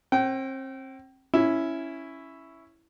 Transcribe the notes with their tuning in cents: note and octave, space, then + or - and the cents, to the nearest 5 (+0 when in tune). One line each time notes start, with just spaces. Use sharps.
C4 +35 G5 -30
C#4 +0 E4 +0